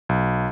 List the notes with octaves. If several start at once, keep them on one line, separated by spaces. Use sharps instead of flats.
B1